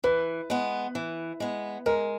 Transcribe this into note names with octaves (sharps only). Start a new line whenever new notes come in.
E3 B4
G#3 B3
E3
G#3 B3
G#3 A#4